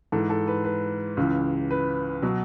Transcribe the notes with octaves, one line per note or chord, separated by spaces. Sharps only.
G#2 E3 A4
A4
B4
B4
C#2 C#3 E3
B4
B2 F#3